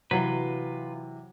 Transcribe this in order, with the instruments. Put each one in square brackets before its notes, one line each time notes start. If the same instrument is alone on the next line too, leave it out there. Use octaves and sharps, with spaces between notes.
[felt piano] C3 E3 [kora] F#3 [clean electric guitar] F4 B4